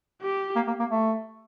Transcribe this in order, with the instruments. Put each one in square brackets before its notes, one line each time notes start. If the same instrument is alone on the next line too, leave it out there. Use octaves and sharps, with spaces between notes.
[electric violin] G4
[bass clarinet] A#3
A#3
A#3
A3